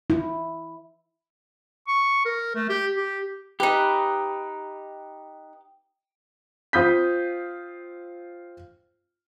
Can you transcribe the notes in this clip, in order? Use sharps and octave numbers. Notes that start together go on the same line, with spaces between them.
E4
C#6
A#4
A3
G4
G4
D#4 G4 B4
C4 F4 D#6 G6 B6